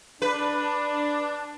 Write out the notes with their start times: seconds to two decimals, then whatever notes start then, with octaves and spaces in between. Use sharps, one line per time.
0.22 D4 B4